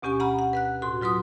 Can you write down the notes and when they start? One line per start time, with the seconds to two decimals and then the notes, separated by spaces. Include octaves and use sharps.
0.02 D2 B2 C#4 G4 G#5 C#6
0.20 F#5 A#5 B5 F6
0.39 F#5
0.53 B4 F#5 F#6
0.82 A2 F#4 C6
1.01 F#3 F4 B4 C6 D#6